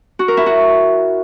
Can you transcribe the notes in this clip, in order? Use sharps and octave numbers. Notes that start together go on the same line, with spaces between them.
F#4
A#4
E4
F#4